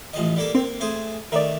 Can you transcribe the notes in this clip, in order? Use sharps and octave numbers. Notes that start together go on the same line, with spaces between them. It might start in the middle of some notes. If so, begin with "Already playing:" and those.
A1 F3 D#5
G3 A#3 A4
A#3 C4
A3 G#4 C5
D#3 A3 A#4 D5